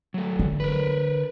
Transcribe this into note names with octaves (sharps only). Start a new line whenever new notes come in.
F#3 A3
D3
A#4 B4